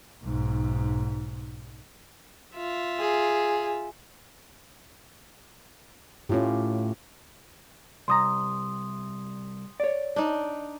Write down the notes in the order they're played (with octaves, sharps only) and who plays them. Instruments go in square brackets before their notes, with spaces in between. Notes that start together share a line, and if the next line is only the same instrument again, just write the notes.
[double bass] B1 G#2
[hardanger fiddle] F4 E5
[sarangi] G#4
[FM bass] A2 [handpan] C#4 F4 G4
[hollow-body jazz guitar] C2 A#5 [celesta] C6 D#6
[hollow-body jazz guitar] C#5 D5
[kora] D4 D#4